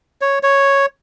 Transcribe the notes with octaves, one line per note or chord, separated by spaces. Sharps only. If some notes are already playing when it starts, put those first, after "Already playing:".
C#5
C#5